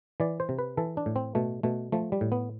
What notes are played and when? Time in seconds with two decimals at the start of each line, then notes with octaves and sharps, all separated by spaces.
0.20 E3 D5
0.40 C5
0.49 C3
0.59 B4
0.77 E3 A4
0.97 D4
1.06 A2
1.16 C4
1.35 B2 A3
1.63 B2 A3
1.92 F3 A3
2.12 G3
2.21 A2
2.32 B3